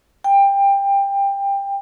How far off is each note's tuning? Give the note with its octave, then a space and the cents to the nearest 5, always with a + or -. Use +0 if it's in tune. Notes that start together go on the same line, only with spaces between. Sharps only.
G5 +20